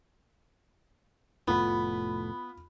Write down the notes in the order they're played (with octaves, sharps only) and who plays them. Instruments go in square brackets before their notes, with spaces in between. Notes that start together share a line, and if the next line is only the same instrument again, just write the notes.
[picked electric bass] F1 A2 A3 [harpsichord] B3 [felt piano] F4 B5